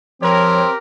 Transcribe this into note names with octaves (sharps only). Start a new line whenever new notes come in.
F3 C4 G4 A#4 C#5